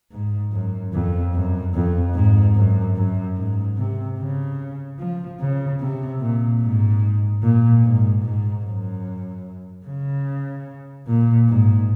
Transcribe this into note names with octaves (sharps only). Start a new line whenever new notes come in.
G#2
F#2
F2
F#2
F2
G#2
F#2
F#2
G#2
C3
C#3
F3
C#3
C3
A#2
G#2
A#2
G#2
G#2
F#2
C#3
A#2
G#2